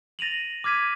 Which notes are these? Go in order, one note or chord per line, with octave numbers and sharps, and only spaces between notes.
A6 A#6 D#7 F7 F#7
D6 F6 G#6 B6 D#7